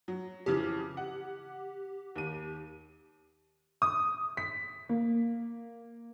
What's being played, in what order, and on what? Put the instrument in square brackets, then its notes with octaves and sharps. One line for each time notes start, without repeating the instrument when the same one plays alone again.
[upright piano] F#3
[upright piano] F2 C#3 E3 [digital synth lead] G4
[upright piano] F#5
D#2 D#7
[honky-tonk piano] D#6
B6
A#3